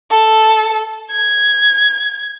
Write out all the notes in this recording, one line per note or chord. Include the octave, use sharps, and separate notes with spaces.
A4
G#6